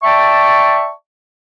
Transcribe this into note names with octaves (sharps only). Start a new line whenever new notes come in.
D5 E5 G5 A5 C#6